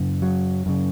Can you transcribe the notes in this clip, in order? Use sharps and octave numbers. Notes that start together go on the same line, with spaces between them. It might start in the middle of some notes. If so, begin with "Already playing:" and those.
Already playing: F#2 C#3
F#3
F#2 C#3